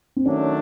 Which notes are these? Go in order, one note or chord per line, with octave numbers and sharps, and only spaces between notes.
C4
D#3 F#3 A3 C#4 D4